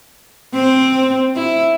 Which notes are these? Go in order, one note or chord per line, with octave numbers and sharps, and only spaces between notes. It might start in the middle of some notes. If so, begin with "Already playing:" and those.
C4
E4